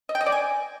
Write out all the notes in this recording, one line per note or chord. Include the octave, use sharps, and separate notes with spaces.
D#5
G5
D#5
D5
G#5